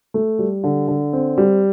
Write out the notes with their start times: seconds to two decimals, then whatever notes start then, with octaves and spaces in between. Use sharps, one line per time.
0.14 A3
0.39 G3
0.64 D3
0.88 D3
1.13 C4
1.38 G3